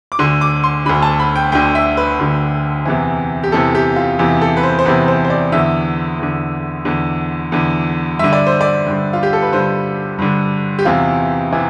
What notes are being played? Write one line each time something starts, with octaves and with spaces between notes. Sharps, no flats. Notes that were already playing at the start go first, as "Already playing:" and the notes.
D6
D2 D3 C6
D6
C6
D2 D3 B5
A5
B5
G5
D2 D3 G5
E5
B4
D2 D3
E2 C3 E3
G4
E2 C3 E3 A4
G4
F4
E2 C3 E3 G4
A4
B4
C5
C5
E2 C3 E3 B4
C5
C5
D5
E2 D3 E5
E2 D3
E2 D3
E2 D3
G2 D3 E5
D5
C5
D5
G2 D3
F4
G4
A4
B4
G2 D3 C5
G2 D3
G4
E2 C3 E3 F4
C3 E3